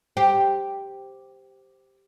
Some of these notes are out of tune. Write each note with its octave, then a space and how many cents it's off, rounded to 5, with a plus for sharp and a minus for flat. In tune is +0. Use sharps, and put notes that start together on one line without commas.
G4 +0 C5 +0